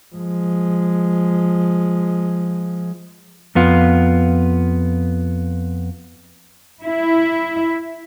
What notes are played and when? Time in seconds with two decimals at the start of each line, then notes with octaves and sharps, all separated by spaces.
0.15 F3 G#3
3.55 F2 B3 F4
6.84 E4